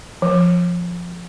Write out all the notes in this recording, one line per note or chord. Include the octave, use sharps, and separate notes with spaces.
F3